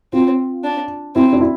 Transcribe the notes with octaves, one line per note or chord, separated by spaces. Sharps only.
C4 F4
D4
C4 E4
D4
E4